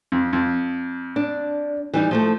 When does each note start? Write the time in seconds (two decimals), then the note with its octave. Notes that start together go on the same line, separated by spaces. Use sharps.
0.12 F2
0.33 F2
1.16 D4
1.93 E3 G3 D#4
2.11 F3 G#3 A3